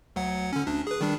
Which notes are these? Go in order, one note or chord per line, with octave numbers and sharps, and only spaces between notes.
D2 F#3 F#5
D3 C#4
D2 D4
G#4 B4
D#3 G3 D4